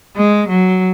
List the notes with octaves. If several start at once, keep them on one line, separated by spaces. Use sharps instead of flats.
G#3
F#3